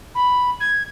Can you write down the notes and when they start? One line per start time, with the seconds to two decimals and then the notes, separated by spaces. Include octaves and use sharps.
0.15 B5
0.60 G#6